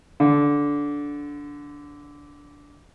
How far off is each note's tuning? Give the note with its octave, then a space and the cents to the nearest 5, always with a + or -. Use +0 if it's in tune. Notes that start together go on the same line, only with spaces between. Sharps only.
D3 -15